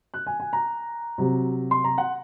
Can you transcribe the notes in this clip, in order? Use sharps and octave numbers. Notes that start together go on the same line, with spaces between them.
F#6
G#5
G#5
A#5
C3 F#3
C6
A#5
F#5